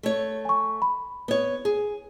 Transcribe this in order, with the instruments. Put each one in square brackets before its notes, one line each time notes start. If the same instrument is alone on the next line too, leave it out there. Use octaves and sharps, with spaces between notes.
[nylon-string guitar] A3 C#5
[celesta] G#5 C#6
B5
[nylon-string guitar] B3 C#5
G#4